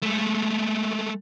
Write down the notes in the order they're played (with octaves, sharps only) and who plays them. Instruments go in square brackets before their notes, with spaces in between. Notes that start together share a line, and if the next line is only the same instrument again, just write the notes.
[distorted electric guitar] G#3 A3